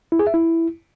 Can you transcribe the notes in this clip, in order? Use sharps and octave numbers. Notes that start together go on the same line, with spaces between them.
E4
G#4
E5
E4